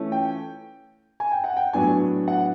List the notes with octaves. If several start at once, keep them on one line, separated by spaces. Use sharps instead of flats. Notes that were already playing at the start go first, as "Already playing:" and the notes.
Already playing: E3 A3 C#4 F4
G5
G#5
G5
F#5
G5
A2 F#3 B3 D4 G#5
F#5